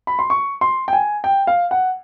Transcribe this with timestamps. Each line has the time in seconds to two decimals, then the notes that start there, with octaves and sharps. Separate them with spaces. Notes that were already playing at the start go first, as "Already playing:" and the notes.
0.07 B5
0.19 C6
0.30 C#6
0.61 C6
0.88 G5
0.93 G#5
1.24 G5
1.47 F5
1.71 F#5